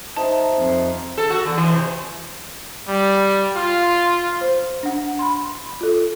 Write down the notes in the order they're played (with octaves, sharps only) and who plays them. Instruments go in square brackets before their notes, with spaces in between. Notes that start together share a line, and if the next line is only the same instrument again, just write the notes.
[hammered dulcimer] D#4 C5 E5 [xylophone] A5
[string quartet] F2
[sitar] A4
F#4
E2
E3
C3
[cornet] G3
F4
[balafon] C5
D4 F#5
B5 C6
F4 A4